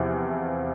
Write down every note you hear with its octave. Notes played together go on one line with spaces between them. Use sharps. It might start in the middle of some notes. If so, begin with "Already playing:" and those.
Already playing: E2 C3 F3